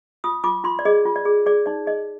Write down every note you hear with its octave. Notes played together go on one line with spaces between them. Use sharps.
F4 D#6
F4 D6
F4 C6
D5
G#4 D#5
F4
D5
G#4
G#4 D5
D#4 D5
G#4 D#5